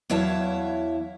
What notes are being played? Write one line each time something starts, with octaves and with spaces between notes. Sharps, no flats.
E2 F#3 E4 C#5 F5 A5